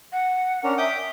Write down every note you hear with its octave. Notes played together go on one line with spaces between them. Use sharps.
F#5
C#4 D4 A#4
E5 G5 D6 D#6